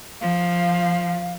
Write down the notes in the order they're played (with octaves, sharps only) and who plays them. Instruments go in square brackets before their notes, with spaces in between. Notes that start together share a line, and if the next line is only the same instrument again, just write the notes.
[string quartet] F3 [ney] F5